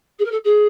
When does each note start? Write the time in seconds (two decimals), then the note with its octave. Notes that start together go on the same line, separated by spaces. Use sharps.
0.18 G#4
0.24 A#4
0.31 A4
0.44 G#4